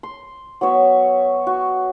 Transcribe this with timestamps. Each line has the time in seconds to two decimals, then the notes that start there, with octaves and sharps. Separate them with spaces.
0.03 C6
0.61 F#3 B3 C#5 E5
1.47 F#4